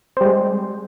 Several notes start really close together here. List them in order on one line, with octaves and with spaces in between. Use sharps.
C4 G3 G#3